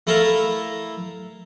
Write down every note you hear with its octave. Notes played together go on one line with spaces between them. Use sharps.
A3 E4 A4 A#4 F5